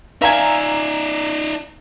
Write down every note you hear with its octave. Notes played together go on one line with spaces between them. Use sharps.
D#4 D5 E5 F5 G#5 A#5